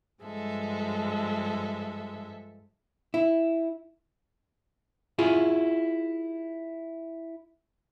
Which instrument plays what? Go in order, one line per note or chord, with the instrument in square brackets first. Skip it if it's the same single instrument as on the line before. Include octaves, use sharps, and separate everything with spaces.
[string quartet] G2 F3 G#3 A4 E5
[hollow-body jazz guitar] E4
E4 F4 G#4